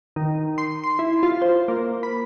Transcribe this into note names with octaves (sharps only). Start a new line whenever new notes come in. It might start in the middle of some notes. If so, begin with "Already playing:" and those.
D#3
C6
C6
E4
F4
C5
A#3
B5